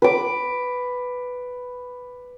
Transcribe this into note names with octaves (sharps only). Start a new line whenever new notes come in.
B4 D6